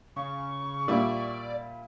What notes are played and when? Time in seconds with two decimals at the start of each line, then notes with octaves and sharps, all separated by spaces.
0.16 C#3 C#6
0.88 A#2 G3 E4 D5